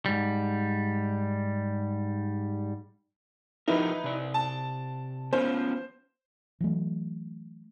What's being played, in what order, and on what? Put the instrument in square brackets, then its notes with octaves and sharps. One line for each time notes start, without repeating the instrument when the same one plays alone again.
[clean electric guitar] G#2 G3
[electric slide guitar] F3 G4 A#4 [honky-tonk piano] D#4 E4 B4
[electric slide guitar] C3 D5
[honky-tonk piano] A5
[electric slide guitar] B3 C#4 F4 [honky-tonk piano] C5
[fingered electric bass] E3 F#3 A3